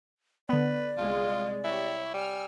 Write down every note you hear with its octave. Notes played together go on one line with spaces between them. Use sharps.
D3 B3 B4 D5
C2 G#3 F4
E4 G4 C#5
G3 G#5 E6 F6